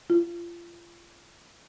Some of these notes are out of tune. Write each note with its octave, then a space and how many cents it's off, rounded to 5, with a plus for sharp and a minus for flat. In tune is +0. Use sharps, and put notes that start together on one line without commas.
F4 -30